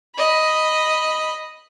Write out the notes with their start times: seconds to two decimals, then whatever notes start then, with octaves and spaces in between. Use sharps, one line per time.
0.15 D#5 B5